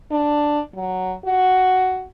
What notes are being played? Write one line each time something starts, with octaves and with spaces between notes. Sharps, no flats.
D4
F#3
F#4